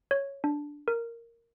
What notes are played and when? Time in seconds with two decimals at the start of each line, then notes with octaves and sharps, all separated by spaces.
0.11 C#5
0.44 D4
0.88 A#4